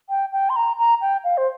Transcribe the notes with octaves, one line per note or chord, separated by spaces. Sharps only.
G5
G5
C6
A#5
A#5
G5
F5
C5